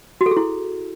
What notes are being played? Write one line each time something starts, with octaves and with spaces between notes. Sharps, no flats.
F#4
A4
G#4
E4